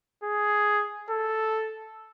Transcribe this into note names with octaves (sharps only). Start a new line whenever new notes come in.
G#4
A4